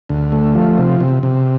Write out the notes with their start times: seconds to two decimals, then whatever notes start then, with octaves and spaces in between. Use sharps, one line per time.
0.09 D2
0.32 A3
0.55 F3
0.78 C3
1.00 C3
1.23 C3